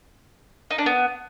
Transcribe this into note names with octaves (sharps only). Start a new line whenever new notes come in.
D#4
D4
B3